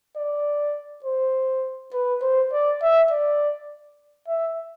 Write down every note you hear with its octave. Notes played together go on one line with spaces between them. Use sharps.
D5
C5
B4
C5
D5
E5
D5
E5